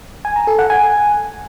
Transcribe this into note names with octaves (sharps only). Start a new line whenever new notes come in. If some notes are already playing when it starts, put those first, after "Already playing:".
G#5
A#5
A4
F#5
G#5